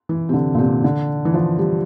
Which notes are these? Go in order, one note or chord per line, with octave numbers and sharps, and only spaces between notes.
E3
C3
D3
A#2
C3
D3
E3
F3
G3